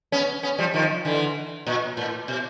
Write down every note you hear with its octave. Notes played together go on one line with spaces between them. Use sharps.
B3 C#4
B3 C#4
F3 G3
D#3 F3
D3 E3
A#2
A2
B2